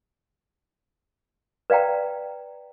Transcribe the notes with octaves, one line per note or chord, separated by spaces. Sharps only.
B4 D5 F5 G5 A#5